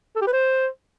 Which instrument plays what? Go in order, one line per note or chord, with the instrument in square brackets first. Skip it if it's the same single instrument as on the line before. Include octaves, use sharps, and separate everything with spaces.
[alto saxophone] A4
G4
B4
C5